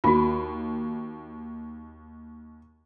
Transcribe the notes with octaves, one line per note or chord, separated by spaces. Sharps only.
D#2 F4 F#4